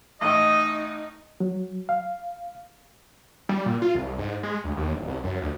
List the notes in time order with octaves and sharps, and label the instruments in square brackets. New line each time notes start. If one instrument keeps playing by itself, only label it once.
[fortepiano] A1 A2 [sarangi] D#4 [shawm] D#5
[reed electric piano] F#3
F5
[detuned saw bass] G3
A#2
F4
C2
G#2
G#3
D2
D#2
D1
C2
F#2
D2